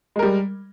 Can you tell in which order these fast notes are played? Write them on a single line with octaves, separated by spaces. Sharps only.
G#3 A#4 G3